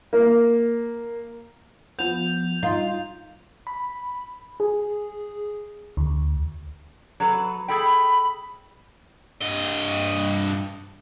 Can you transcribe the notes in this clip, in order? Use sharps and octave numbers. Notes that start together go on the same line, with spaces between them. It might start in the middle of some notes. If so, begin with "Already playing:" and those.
A#3
F3 B3 G6 F7
D#4 F4
B5
G#4
D2
F#3 A4 B4
G#4 A4 G5 B5
G2 D#5